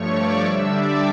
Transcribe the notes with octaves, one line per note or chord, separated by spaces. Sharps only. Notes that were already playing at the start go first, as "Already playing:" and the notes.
Already playing: G2 F3 A3 C#5 C#6
D5 D6
D3 G3 D4 E5 E6
D5 D6